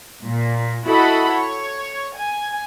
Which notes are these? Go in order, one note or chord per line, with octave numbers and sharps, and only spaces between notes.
A#2
E4 F#4 A4 D#5 F#5 B5
C#5
G#5